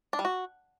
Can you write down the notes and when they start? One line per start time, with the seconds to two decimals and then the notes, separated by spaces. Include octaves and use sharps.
0.13 D4
0.19 G3
0.25 F#4